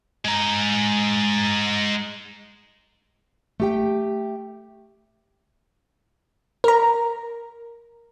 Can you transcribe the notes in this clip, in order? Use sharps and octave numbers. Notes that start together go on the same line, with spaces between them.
G#3 A#5
A3 G4 G5
A#4 A#5